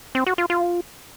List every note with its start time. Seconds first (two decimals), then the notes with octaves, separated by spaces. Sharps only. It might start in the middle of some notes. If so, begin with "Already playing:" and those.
0.15 C4
0.27 F#4
0.38 F4
0.50 F4